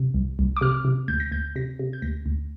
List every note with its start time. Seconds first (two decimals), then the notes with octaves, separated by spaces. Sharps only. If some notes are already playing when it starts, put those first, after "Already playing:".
Already playing: C3
0.14 C2
0.39 C2
0.57 D6
0.61 C3 F6
0.85 C3
1.08 D2 G6
1.20 A#6
1.32 D2 G6
1.56 C3 A#6
1.79 C3
1.93 G6
2.02 D2 A#6
2.26 D2